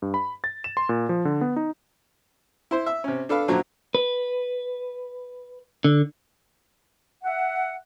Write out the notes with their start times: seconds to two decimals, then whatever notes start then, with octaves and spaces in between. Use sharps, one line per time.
0.02 G2
0.14 B5
0.44 A6
0.64 E7
0.77 C6
0.89 A#2
1.09 F3
1.25 D3
1.41 B3
1.56 D#4
2.71 E4 C5
2.86 E5
3.04 C3 C#4
3.29 D4 A4 B4 F5
3.48 F#2 A#2 D3 F3 F#3
3.95 B4
5.84 D3
7.24 E5 F#5